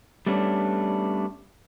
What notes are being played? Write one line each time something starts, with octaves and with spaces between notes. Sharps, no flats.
G3 A3 B3 C#4 D4